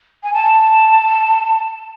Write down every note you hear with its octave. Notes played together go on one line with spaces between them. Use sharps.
G#5
A5